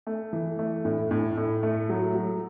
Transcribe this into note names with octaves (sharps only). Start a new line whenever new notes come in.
A3
E3
A3
A2
A2
A2
A3
F#3
F#3